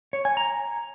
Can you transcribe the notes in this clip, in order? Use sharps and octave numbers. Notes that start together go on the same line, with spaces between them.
C#5
G#5
A#5